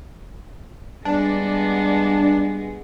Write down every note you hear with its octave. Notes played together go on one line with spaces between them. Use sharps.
G2 G#3 B3 D4